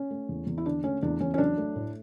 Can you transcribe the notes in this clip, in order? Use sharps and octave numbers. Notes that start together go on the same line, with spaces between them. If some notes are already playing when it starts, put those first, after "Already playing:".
Already playing: C#4
A3
E2
E2
E4
D3 D4
A3 C#4
E2 D4
E2 C#4
C#4
F#3 D4
A3
A2